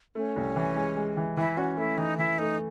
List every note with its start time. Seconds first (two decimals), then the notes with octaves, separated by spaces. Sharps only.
0.15 A3 C#4
0.36 C2
0.56 E3
0.76 G#3
0.97 G#3
1.17 E3
1.37 E3 E4
1.57 C#4 F#4
1.77 A3 E4
1.97 E3 D#4
2.18 E3 E4
2.38 A3 D#4